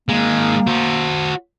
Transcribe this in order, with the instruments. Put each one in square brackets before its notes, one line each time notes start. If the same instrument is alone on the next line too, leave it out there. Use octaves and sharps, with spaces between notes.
[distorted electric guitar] D#3 G#3 [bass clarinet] A#3
[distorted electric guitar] F#4 C5